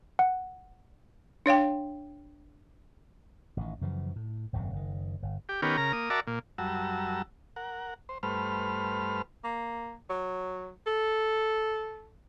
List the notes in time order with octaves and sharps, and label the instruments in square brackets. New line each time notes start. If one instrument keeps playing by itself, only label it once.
[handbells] F#5
[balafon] D4 C#5 F5 G5
[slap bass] A1 D#3
F#2 C#3 E3 F3
A2
D#1 G#1 F#2 C3
F#1 D#3
G1
[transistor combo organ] G4
D#3 B3 C#4 G4 A#4
C#3 A#4 A#5
A#3 D#6
F#4 A#4 D5 E5 A5
A#2
F#2 G3 F#4 A5 A#5 E6
A#4 F#5
C5
G2 A3 B4 C5 F6
[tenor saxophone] A#3
F#3
A4